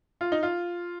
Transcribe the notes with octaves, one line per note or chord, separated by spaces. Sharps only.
F4
D#4
F4